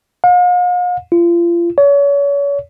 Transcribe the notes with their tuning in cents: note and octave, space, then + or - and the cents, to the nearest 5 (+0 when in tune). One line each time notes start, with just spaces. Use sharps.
F5 +45
F4 -35
C#5 +35